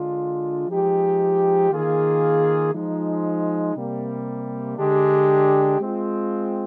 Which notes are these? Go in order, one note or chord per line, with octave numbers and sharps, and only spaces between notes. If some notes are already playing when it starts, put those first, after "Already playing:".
Already playing: D3 G#3 D4 F4
F3 G#3 D#4 G4
D#3 A#3 F4 G#4
F3 G#3 D#4
C3 G3 A#3
D3 G#3 D4 G4
G#3 C4 F4